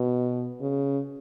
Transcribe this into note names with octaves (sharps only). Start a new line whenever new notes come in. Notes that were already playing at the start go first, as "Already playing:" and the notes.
Already playing: B2
C#3